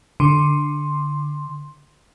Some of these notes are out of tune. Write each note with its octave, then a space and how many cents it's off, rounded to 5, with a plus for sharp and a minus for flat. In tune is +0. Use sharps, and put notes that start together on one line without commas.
D3 +0 C6 +5